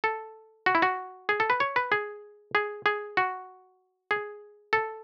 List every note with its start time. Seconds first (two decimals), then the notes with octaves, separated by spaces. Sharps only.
0.04 A4
0.66 F#4
0.75 E4
0.82 F#4
1.29 G#4
1.40 A4
1.50 B4
1.60 C#5
1.76 B4
1.92 G#4
2.55 G#4
2.86 G#4
3.17 F#4
4.11 G#4
4.73 A4